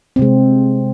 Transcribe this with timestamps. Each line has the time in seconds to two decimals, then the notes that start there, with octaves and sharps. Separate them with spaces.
0.16 C4
0.19 C3
0.22 G#3